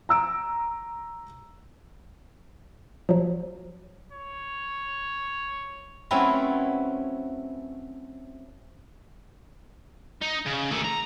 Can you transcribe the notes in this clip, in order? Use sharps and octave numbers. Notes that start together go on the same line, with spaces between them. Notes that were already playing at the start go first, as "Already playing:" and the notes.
A#5 E6 D7
F3 F#3
C#5
F#3 A3 C4 C#4 E4 B4
D#4
C#3
D#3 A3
A#5